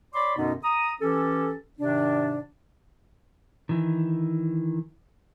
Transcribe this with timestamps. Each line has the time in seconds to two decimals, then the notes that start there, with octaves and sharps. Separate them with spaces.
0.15 C#5 D5 B5 C6 D6
0.37 F#2 B2 D3 B3 D#4
0.64 A#5 D#6
1.01 E3 C#4 G4 A4
1.79 G#2 C3 D#3 D4
3.69 D#3 E3